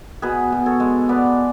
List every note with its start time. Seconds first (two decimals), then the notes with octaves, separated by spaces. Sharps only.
0.22 B2 G#4 B4
0.52 B2
0.66 A4 C#5
0.80 G#3
1.09 B3 B4 D5